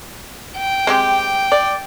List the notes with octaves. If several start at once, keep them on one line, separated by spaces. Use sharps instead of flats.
G5
G#3 C4 G4
D5